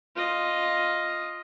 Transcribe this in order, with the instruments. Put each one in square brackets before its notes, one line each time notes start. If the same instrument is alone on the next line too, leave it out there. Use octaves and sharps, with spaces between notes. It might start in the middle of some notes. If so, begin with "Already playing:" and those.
[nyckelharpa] F4 D#5